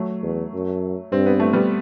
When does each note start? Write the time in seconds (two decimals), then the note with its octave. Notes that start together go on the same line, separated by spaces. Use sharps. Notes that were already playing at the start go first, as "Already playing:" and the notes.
Already playing: F#3 A3
0.23 E2
0.53 F#2
1.12 G2 C4
1.26 B3
1.40 A3
1.53 G3 B3